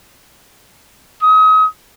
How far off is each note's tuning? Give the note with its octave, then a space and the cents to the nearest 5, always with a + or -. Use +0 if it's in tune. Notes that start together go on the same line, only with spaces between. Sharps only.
D#6 +35